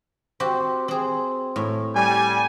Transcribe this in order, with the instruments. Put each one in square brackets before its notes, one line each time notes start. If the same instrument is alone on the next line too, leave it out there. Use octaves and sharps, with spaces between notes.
[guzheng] C4 F#4 G4
C4 G#4
A2
[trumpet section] G3 G#5